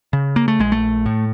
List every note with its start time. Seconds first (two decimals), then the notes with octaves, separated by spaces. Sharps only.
0.13 C#3
0.36 A#3
0.48 A3
0.59 A#1 G#3
0.72 A3
1.06 A2